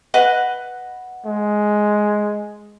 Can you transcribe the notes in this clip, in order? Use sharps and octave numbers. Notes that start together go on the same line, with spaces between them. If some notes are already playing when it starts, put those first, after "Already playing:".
B4 D#5 F#5
G#3